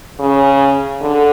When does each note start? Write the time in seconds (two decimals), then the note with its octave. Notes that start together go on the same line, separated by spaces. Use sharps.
0.20 C#3
1.01 D3